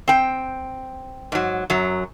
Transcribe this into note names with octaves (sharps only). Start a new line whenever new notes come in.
C4 G5
G#2 F#3
F#2 F#3